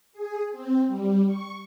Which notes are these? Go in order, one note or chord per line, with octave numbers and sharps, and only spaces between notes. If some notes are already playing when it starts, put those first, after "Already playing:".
G#4
C4
G3
C#6